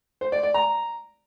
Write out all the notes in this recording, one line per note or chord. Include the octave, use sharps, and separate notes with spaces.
C5
D5
D5
A#5